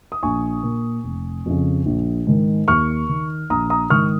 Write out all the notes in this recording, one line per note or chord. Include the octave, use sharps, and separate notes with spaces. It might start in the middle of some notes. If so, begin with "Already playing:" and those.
D#6
A#1 G#5 C#6
A#2
F1
F2 C#3
A#1
G#2 D#3
D#2 C#6 F6
D#3
A#1 A#5 D#6
A#5 D#6
G#2 D#3 C#6 F6